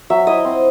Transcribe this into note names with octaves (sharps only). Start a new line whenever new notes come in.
F#3 E5
E4 D#5
C4